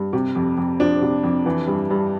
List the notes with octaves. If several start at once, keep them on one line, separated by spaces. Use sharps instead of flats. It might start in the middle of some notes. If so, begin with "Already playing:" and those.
Already playing: G2
C3
F2
F2
F3 D4
C3
F2
E3
G2
G2